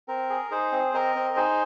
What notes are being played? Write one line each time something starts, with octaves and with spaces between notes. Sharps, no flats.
C4 A#4
G#4
D#4 G#4 C5
C4
C4 A#4 D#5
C4
A#4
D#4 G#4 C5